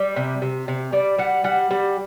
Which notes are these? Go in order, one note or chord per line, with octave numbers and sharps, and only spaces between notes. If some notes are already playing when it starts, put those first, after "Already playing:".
Already playing: G3
C3
C3
C3
G3 D5
G3 F#5
G3 F#5
G3